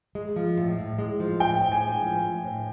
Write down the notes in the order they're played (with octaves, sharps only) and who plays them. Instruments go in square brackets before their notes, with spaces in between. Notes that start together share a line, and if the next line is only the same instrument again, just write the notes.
[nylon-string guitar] G#3
F3
A2
A2
G#3
F3
[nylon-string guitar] A2 [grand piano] G5
[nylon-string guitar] A2
[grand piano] G#5
[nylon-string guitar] G#3
F3
A2
A2